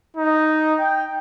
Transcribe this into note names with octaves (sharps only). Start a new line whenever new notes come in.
D#4
G5